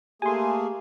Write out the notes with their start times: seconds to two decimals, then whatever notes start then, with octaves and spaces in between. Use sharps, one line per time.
0.22 A3 A#3 G4 G#4 G#5 C6